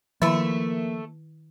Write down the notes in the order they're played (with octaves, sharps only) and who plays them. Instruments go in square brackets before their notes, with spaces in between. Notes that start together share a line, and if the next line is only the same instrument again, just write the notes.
[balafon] D#3 E4 [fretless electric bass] F3 [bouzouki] A3 E5 [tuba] A#3